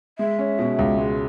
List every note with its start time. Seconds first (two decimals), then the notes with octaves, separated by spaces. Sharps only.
0.19 G#3 E5
0.39 C#4
0.59 B2
0.79 C#2
0.98 G#3